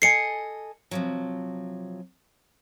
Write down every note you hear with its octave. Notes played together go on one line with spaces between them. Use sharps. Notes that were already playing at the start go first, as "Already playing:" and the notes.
A4 D#5 G#5 C7 C#7
C3 F3 F#3